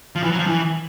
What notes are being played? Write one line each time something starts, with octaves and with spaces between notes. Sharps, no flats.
F3
E3
F#3
F3
E3